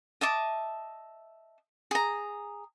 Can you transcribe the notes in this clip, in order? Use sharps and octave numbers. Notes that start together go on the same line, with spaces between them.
D#5 E5 A5 D6
G#4 A#5